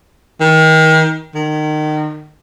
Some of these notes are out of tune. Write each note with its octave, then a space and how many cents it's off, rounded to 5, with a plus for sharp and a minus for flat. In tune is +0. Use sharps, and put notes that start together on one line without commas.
D#3 +30
D#3 -30